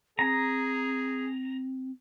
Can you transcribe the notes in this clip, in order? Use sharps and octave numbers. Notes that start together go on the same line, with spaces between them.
C4 G#4 A#5